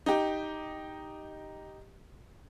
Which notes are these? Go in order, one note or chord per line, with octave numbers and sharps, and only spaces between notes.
D#4 G4